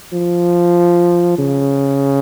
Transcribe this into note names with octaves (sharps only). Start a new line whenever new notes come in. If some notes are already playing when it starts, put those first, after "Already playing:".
F3
C#3